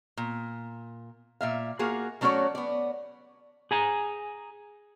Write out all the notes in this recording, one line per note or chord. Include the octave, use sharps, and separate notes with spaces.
A#2
A#2 E5 F5
A#3 F4 F#4 G#4
F#3 A3 C#4 F#4 C#5 D5
B3 D5
G#4 G#5 A#5